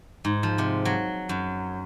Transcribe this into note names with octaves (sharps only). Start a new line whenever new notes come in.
G#2
F3
C3
F#3
F#2